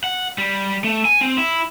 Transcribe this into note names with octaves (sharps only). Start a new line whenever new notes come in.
F#5
G3
A3
G#5
C4
E4